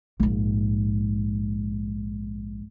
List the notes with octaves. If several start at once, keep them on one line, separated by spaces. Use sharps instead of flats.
A#1 G#2